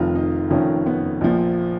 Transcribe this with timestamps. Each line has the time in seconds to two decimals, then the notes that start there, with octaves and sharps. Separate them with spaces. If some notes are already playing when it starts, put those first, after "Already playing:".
Already playing: F1 F2 D#3 F4
0.15 D#4
0.50 F1 F2 D#3 C#4
0.86 B3
1.21 A#1 A#2 F3